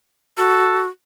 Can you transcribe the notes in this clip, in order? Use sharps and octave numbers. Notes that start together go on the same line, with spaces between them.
F#4 A4